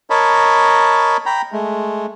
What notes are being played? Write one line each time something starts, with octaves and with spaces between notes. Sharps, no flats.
A#4 C#5 D#5 A5 B5
G5 A#5 B5
G#3 A3